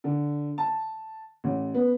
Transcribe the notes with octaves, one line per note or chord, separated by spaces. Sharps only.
D3
A5
A1
B3